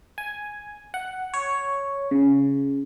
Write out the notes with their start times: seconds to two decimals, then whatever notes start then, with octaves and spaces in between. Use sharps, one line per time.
0.18 G#5
0.94 F#5
1.34 C#5
2.11 C#3